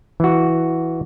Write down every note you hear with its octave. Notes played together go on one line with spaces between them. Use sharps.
E3 F#4